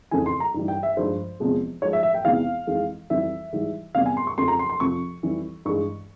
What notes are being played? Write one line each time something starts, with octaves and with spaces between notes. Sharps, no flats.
F2 C#3 E3 G#5
C6
A#5
G2 E3 G3
G5
E5
G2 F3 G#3 C5
E2 C3 F3 G#3
G#2 F3 G#3 C#5
E5
E5
G5
E2 C3 E3 G#3 F5
F2 E3 G#3
F2 E3 G3 E5
G#2 E3 G3
E2 C3 G3 F5
G#5
C6
C#6
F2 C#3 F3 C6
A#5
C6
C6
F2 C3 F3 C#6
F2 E3 G3
G2 E3 G#3 C#6